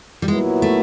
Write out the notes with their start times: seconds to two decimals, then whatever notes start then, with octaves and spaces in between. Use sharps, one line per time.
0.22 G3
0.28 A#2 F#3 G#3 B3 E4
0.62 A3